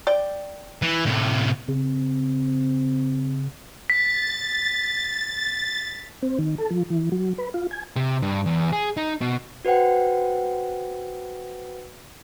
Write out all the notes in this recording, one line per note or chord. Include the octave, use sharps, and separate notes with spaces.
D5 G5
E3
A2 C3
C#3 C4
A6 B6
C4
D#3
A4
F3
E3
F#3
B4
F4
G#5
C3
G2
E2
G#4
D#4
B2
F#4 B4 C5 F#5 G5